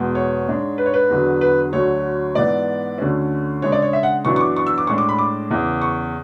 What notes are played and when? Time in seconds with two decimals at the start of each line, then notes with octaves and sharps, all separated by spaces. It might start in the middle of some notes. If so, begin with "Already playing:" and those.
Already playing: E2 B2 G#3 B3
0.15 C#5
0.47 G#2 G#3 D4
0.78 B4
0.86 C#5
0.94 B4
1.09 E2 D3 F#3
1.41 B4
1.73 D2 D3 F#3 C#5
2.35 G#2 E3 B3 D5
2.98 D2 D3 A3 C#4
3.62 C#3 G#3 D4 C#5
3.72 D5
3.82 C#5
3.93 E5
4.03 F#5
4.25 F#2 E3 B3 D4 C#6
4.36 C#6
4.41 D6
4.56 C#6
4.67 E6
4.78 D6
4.87 A2 G#3 D4 C#6
4.98 D6
5.09 B5
5.19 D6
5.50 E2 C#3 E3
5.82 C#6